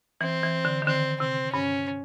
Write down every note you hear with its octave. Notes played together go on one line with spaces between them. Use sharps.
E3 C4
E3
D3
D#3
D3 C4
C3 C4
G2 C#4